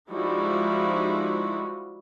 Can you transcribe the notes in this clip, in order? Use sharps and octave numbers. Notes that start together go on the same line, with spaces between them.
F3 G3 G#3 D#4 E4 F#4